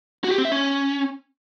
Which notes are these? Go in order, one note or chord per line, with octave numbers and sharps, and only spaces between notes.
F#4
G4
C4
E5
C#4